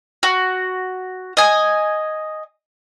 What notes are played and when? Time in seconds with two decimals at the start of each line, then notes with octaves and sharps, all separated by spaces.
0.23 F#4
1.37 D#5 G#5